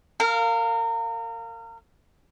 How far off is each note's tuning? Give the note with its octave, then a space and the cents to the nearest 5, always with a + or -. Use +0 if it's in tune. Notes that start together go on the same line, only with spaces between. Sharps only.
A#4 -30 F5 +0